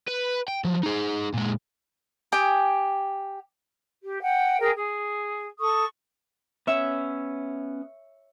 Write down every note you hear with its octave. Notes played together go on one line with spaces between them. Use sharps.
B4
G5
F3 F#3
D#4 G#4
A#2 G#3
G4 G5 G#5 D#6
G4
F#5 G5
G#4 A#4 G5
G#4
A4 C#6 D#6
B3 C#4 C#5 E5 E6